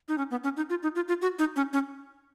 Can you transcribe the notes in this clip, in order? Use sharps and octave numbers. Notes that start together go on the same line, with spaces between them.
D#4
C#4
B3
C#4
D#4
F4
D#4
F4
F4
F#4
D#4
C#4
C#4